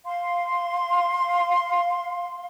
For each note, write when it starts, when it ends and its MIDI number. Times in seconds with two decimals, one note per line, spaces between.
0.05 2.46 77
0.05 2.46 84